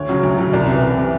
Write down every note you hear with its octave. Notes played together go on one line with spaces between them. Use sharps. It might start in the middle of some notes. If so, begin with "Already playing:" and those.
Already playing: D2 C#5
C#3 F#3
D2
C#3 F#3
C2 D5
C3 E3
C2
C3 E3